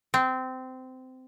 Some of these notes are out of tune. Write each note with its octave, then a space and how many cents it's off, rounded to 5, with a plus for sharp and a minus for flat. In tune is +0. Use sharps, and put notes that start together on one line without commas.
C4 -20